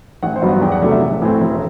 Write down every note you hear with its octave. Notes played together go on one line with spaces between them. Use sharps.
A1 F#5
C5
G2 F#3 B3
F#5
E2 G5
F#5
C3 F#3 A3 D4 D5
E5
A1
A2 E3 A3 C4
E1